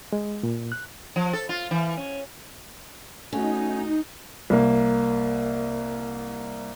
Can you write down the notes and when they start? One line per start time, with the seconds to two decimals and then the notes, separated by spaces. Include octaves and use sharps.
0.13 G#3
0.43 A#2
0.72 F#6
1.16 F3
1.33 A4
1.49 F4
1.71 E3
1.97 C#4
3.33 A3 C#4 D#4 F#4
4.50 C2 A#3